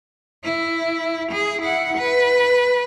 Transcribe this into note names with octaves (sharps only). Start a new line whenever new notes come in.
E4
G#4
E4 F#5
B4